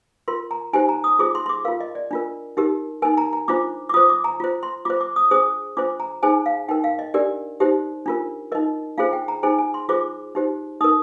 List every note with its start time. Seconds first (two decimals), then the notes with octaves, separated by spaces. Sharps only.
0.28 F4 A#4 C6
0.51 A#5
0.73 D#4 G4 C5 G#5
0.89 A#5
1.04 D#6
1.19 F4 G#4 C5 D6
1.35 C6
1.46 C6
1.49 D6
1.65 F4 A#4 F5
1.80 D#5
1.95 D5
2.11 D4 F4 A#4
2.57 D#4 G4 A#4
3.02 D#4 A#4 G#5
3.18 A#5
3.33 A#5
3.48 D4 F4 C5 D6
3.89 D6
3.94 F4 D#6
3.97 C5
4.09 D6
4.24 A#5
4.40 F4 C5
4.63 C6
4.85 F4 C5 D6
5.01 D6
5.16 D#6
5.31 D4 G#4 C5 D#6
5.77 D4 F4 C5 D6
6.00 A#5
6.23 D#4 G#4 C5 G#5
6.46 F5
6.69 D#4 A#4 G5
6.84 F5
6.99 D#5
7.14 D4 G4 A#4 D5
7.60 D#4 G4 C5
8.06 D4 F4 A#4
8.52 D#4 A#4 D#5
8.98 D4 F4 G#4 C5 F5
9.13 G5
9.28 A#5
9.43 D#4 G#4 C5 G#5
9.58 G#5
9.74 C6
9.89 F4 G#4 C5 D6
10.35 D#4 G4 C5
10.81 D#4 D#6
10.84 A#4